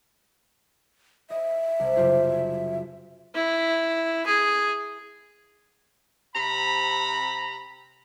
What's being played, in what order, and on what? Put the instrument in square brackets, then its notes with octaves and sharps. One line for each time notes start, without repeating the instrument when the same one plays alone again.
[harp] D#5 [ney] E5
[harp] C2
F#1 F4 G4
[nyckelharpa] E4
G#4
[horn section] C3 A#5 B5